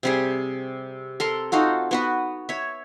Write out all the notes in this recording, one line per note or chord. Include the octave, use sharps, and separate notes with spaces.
C3 G3 G#4
A4 A#4 C6
D#4 F4 F#4 A4
B3 F#4 B4
C#5 E5